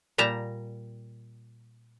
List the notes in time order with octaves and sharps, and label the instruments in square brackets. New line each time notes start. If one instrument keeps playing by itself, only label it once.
[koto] A#2 G3 A5 A#5